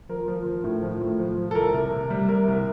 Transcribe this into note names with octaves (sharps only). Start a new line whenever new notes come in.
F3 A#4
F3
F3
A2
F3
A2
F3
F3
A4
C2 A#4
C3
C3
G3
C3 A#4
C2